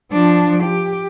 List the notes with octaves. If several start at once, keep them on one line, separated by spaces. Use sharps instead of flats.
F3 D4
G4